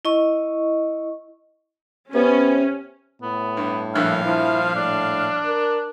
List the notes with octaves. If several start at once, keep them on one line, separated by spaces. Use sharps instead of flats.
E4 D#5 C#6
C3 B3 C#4
A2 B3
G2
A#1 G2 E5 F5 F#6
F3 E4
A2 D4
A#4